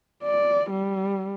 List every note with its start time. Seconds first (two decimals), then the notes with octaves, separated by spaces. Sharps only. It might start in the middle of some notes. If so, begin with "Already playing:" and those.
0.24 D5
0.70 G3